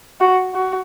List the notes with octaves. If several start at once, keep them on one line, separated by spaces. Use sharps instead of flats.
F#4
F#4